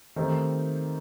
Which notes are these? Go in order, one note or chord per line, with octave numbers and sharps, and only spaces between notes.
D#3 A3 C4 D#4 G4